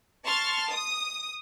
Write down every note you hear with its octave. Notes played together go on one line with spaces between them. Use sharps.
A5 C6 C#6 F6 A6
D#6